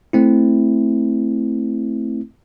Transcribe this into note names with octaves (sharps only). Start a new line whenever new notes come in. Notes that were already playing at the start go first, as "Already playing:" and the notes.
A3 C4 E4